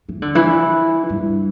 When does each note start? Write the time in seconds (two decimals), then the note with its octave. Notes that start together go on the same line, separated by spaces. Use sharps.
0.09 E3
0.22 D3
0.35 E3
1.09 G2